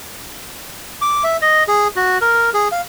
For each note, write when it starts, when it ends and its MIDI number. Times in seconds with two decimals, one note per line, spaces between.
1.01 1.24 86
1.24 1.37 76
1.42 1.64 75
1.68 1.88 68
1.96 2.18 66
2.21 2.50 70
2.54 2.68 68
2.72 2.81 77